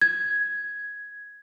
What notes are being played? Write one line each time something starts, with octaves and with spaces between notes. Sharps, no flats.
G#6